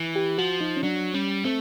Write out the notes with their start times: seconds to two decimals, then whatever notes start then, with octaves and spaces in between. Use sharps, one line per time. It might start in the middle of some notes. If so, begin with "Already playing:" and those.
Already playing: E3
0.16 G4
0.38 F3 F#4
0.61 D#4
0.77 C#4
0.83 F#3 D4
1.14 G3 C#4
1.44 A3 C4